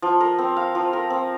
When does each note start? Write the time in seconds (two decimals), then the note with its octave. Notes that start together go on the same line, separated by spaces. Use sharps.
0.02 F3
0.20 A#4
0.39 C4
0.57 F5
0.75 F3
0.93 A#4
1.10 C4